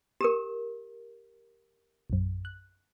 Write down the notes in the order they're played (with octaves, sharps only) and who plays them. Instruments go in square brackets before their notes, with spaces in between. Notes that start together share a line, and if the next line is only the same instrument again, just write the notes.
[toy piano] G4 A#4 [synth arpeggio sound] C#6 D#6 E7
[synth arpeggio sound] A#1 F#2
F#6